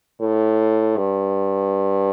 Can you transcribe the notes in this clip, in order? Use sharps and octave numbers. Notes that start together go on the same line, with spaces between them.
A2
G2